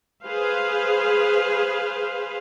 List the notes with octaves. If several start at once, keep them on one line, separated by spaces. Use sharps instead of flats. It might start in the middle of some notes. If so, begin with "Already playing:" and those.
G#4 B4 C5 F5